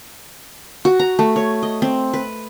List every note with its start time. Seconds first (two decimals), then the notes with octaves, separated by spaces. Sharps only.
0.85 F#4
0.99 A#5
1.19 A3
1.36 C#5
1.63 D#5
1.82 C4
2.13 B4